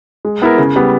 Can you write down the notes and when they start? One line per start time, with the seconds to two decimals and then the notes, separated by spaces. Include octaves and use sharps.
0.25 G#3
0.42 B3 E4 A#4
0.58 C#3
0.76 G3 B3